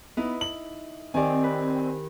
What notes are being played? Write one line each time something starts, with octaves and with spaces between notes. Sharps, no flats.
B3 D#4 E4 B4
F#7
D#3 C4 G4 D5 G#5
B4